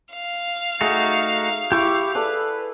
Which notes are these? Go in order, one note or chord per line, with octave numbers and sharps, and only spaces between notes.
F5
A3 D#4 F#4 G#4
E4 G4 C#6 D6
G#4 A4 B4 D5